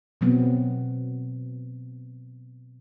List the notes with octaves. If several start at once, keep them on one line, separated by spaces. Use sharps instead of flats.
B2 F#3 B3 C4